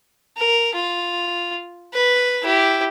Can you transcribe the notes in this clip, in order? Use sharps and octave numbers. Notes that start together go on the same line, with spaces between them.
A#4
F4
B4
E4 G4